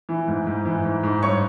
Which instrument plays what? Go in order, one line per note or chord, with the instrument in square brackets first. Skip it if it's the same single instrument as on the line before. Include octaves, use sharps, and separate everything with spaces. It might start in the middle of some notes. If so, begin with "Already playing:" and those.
[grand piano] E3
G#2
G#2
E3
G#2
G#2
G2 C#5 C#6